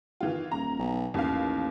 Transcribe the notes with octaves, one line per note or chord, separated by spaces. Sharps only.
D#3 E3 F4
D#1 A#5
B1
A1 D#2 F5